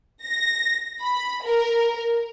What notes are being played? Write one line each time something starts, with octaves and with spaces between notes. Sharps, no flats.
A#6
B5
A#4